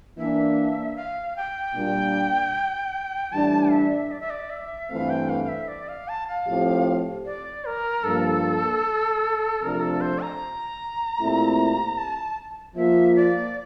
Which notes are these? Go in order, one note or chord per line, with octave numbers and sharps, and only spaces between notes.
E3 A#3 D4 E5
F5
G5
A#2 G3 D4
A2 E3 G3 D4 A5
E5
D5
E5
D5
E5
G2 E3 A3 C4 F5
G5
F5
F5
E5
D5
F5
A5
F5
A2 F3 C4 G4
D5
A#4
G2 F3 A#3 A4
C3 F3 A3 D4 A#4
A4
C5
A#5
A#2 A3 C4 E4 G4
A5
F3 A#3 F4 E5
D5